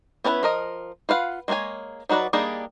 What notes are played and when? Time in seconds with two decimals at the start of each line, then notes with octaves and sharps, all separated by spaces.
0.24 B3 C#4 D4 E4 B4
0.43 F3 A#4 D#5
1.09 F4 B4 F5 F#5
1.48 G#3 A#3 D4 C#5 G#5
2.09 F#3 D#4 F#4 B4 D5
2.33 G3 A#3 D4 D#4 G#4